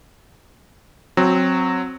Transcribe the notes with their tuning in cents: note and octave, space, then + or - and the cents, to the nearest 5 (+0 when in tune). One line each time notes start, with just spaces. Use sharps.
F#3 -10 C4 +5